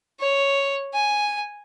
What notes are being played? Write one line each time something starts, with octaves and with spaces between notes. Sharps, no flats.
C#5
G#5